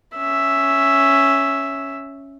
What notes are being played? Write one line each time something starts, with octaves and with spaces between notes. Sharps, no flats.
C#4 E5